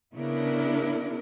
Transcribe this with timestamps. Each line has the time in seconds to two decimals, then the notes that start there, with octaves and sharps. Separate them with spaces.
0.14 C#3 B3 D4 E4 A#4